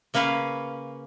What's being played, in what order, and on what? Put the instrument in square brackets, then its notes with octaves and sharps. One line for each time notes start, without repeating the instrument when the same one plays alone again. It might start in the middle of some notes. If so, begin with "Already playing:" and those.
[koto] C#3 A#3 C#4 B4 F5